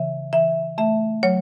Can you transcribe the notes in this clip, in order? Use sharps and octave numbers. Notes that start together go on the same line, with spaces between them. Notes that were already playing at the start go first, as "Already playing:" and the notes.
Already playing: C#3 E3 E5
E3 E5
A3 E5
F#3 C#5